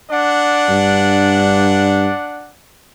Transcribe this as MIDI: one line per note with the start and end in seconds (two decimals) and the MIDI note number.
0.11 2.50 62
0.11 2.50 74
0.11 2.50 78
0.70 2.09 43